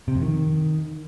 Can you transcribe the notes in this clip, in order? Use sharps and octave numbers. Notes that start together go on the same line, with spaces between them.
C3
F2
D#3